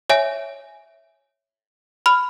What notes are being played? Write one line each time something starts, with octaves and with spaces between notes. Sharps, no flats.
C#5 E5 G#5
B5 F6